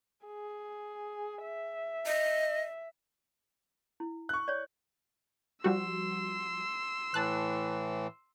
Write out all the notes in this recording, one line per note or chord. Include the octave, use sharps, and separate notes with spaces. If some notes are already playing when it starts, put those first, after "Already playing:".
G#4
E5
D#5
E4
C#6 F#6
C#5 D5
F3 G3 F#4 C6 E6
A2 E3 A5 F#6